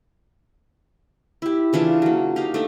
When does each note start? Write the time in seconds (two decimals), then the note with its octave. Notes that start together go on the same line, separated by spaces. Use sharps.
1.42 E4 G4
1.73 C#3 E3 D4 F4
2.02 F#3 A#3
2.36 D#4 G4 F5 A#5
2.54 A3 D4 D#4